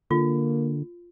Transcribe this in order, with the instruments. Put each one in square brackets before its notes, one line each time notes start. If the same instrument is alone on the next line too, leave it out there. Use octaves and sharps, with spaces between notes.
[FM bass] D3 [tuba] A#3 [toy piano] F4